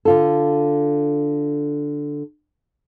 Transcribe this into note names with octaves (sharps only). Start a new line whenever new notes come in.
D3 F4 A4